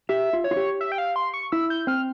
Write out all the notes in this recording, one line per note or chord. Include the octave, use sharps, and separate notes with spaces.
G4 E5
F4
C#5
F4
G4
E5
G5
F5
C6
C#6
E4 E6
G6
C4 F6